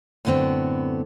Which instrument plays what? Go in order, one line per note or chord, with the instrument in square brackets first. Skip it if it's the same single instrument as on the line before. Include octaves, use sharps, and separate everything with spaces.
[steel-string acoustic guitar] F#2 A2 D3 B3 C4